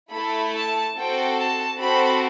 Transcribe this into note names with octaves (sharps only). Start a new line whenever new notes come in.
A3 E4 A4 B5
A5
C4 F#4 A4 G5
A5
C4 F#4 A4 B5